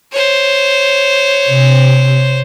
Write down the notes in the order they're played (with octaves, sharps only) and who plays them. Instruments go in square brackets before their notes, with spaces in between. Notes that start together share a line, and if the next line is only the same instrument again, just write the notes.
[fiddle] C5 C#5
[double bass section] C3